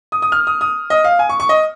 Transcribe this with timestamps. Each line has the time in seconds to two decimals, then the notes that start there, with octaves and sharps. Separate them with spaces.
0.12 D#6
0.22 D#6
0.32 F6
0.47 D#6
0.61 D#6
0.90 D#5
1.04 F5
1.19 G#5
1.29 C#6
1.40 C#6
1.49 D#5